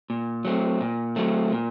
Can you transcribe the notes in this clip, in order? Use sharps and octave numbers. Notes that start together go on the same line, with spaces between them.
A#2
F#3 A3 C4
A#2
F#3 A3 C4
A#2